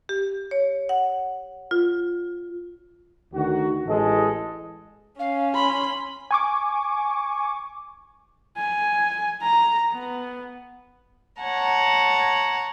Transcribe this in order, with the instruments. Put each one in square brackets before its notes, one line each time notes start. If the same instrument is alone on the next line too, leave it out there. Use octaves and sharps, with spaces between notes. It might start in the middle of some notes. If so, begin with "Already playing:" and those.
[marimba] G4
C#5
F#5
F4
[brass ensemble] D2 D#3 F#4
A1 A2 G#3 A4 D#5
[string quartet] C#4 [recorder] F5
[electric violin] B5 [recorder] C6
[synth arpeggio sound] G#5 C#6 D6
[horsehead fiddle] G#5
A#5
B3
[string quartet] C#5 F#5 A5 A#5